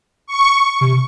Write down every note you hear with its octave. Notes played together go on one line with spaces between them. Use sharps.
C#6
C3